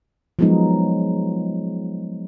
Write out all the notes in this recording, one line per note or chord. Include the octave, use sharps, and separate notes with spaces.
F3 F#3 G#3 B3 D#4